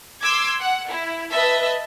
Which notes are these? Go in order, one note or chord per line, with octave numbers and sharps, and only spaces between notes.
C6 D6 E6 G#6
F#5
E4
B4 D#5 E5 A5